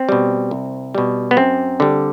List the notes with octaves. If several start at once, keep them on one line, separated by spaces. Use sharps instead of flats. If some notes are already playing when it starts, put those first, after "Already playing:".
Already playing: C4
B2 G3
C2
B2 G3
B3
F#2 C4
D3 G3